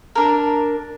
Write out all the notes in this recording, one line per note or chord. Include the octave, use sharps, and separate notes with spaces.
D4 A#4